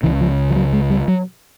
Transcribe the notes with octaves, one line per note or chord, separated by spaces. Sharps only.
C#2 C#3 E3
F3
F3
F#3
G#3
G3
F#3